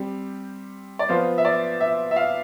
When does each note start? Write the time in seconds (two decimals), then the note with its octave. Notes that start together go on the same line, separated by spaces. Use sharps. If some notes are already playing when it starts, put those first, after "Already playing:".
Already playing: G3 C4 G4
0.99 D5
1.09 F3 B3 F4 C5
1.38 E5
1.45 D5
1.80 E5
2.11 E5
2.16 F5